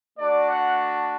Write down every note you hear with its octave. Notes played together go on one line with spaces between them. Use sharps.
A3 D4 F#4 D5
F#5